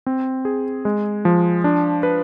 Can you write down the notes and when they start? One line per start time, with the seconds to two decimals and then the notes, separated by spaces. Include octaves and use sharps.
0.06 C4
0.45 G#4
0.85 G#3
1.25 F3
1.64 D4
2.03 B4